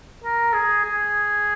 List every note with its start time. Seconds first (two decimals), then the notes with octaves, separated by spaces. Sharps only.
0.24 A#4
0.53 G#4
0.84 G#4